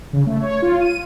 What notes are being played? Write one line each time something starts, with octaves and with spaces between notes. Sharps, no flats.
C#3
A3
C#5
F4
D#7